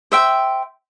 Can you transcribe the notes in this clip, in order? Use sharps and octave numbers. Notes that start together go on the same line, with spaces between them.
C5 E5 G5